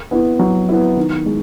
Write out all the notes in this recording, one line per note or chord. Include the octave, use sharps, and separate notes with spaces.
B3 E4
F#3
B3 E4
D#3
G#3